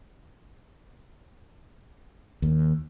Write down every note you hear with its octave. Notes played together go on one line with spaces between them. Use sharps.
D#2